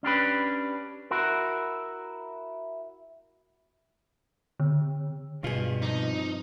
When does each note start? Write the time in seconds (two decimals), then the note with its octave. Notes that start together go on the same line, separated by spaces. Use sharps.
0.03 C#4 D4 G4 B4
1.11 E4 F#4 A#4
4.60 D3
5.44 G2 B2 F4 G#4
5.82 C3 F3 D#4